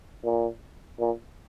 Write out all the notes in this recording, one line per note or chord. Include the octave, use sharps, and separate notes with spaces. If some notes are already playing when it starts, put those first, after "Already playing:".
A#2
A#2